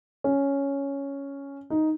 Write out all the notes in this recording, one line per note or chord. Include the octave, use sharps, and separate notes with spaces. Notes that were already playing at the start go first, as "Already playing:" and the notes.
C#4
D#4